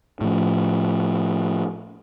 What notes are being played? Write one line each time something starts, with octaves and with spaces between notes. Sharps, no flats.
A2 F3